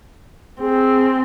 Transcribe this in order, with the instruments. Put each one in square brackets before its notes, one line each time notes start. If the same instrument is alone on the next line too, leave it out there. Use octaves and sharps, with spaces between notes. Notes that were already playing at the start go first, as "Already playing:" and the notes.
[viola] C4 [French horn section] G#4